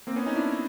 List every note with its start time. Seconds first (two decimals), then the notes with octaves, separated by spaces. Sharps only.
0.07 A#3 C4
0.16 B3 C#4
0.26 C#4 D#4
0.35 D4 E4